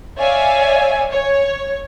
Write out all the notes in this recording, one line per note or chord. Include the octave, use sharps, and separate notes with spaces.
C#5 D5 E5 F5 G#5
C#5